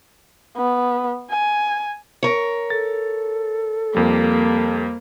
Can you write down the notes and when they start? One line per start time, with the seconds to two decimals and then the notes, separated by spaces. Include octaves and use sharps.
0.57 B3
1.30 G#5
2.23 A#4 C#5
2.70 A4 A6
3.95 F2 G3 A#3